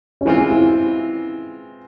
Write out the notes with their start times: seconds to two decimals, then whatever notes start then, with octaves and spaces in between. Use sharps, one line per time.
0.21 C#4
0.25 E3 G#3 C4 E4 F4
0.38 C#4
0.50 E4